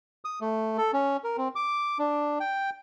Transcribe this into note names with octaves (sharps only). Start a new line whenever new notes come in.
D#6
A3
A4
C#4
A#4
C4
D6
D4
G5